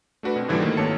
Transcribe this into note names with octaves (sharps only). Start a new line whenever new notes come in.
A3 D4 F#4 B4
B2 C4
G#2 D3 E3 F3 G3 A#3
D#3 A3 A#3
G#1 A#3 A4 C#5 A5 C#7